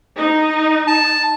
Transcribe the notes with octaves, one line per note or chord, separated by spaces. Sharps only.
D#4
A5